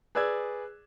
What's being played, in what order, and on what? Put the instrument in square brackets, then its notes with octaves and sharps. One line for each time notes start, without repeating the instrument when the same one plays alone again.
[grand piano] G#4 B4 D5 E6 F#6 G#6